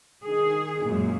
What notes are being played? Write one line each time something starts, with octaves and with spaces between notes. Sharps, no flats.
D#3 G#4
F#2 A#2 G#3